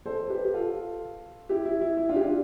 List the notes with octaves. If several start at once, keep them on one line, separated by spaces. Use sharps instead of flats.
A4 C5
G4 B4
G4
F4 A4
E4 G4
E4
E4
E4
D4 F4
G4
D4 F4